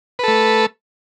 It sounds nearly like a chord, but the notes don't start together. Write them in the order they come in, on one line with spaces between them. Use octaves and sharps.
B4 A4 A3